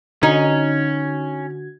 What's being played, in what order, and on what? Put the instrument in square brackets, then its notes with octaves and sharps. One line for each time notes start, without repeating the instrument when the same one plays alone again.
[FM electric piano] D3 F#4 G#6 [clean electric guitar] C#4 [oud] D#4